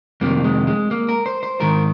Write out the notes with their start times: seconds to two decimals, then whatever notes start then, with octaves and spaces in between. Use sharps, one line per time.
0.21 F2 C3 D#3 A#3
0.44 G#3
0.67 G#3
0.91 A#3
1.09 A#4
1.26 C5
1.43 C5
1.60 G#2 D#3 A#4